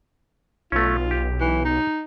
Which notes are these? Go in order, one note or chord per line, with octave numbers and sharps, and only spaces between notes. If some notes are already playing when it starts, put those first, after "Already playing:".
B1 A3 C#4 F4
G4
E3
D#4